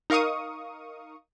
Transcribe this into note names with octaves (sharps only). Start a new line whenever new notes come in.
D#4 A#4 F5 C#6 D#6